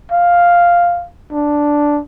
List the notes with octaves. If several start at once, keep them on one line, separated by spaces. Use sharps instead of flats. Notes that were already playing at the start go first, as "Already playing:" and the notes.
F5
D4